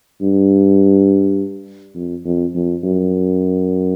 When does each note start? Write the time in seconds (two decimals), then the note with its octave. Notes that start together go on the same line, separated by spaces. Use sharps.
0.21 G2
1.95 F2
2.25 F2
2.55 F2
2.83 F#2